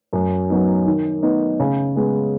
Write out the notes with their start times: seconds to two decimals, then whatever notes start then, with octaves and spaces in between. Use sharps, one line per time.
0.13 F#2
0.50 F#3 B3 D#4
0.86 D#3
1.23 B3 D#4
1.60 C#3
1.96 G#3 B3